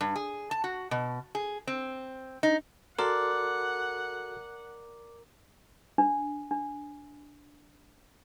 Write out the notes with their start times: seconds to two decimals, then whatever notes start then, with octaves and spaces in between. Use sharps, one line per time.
0.01 G2
0.16 G#4
0.51 A5
0.64 F#4
0.91 B2
1.35 G#4
1.67 C4
2.43 D#4
2.99 F#4 A4 A#4 D5 F#5 C6
5.98 D4
6.51 D4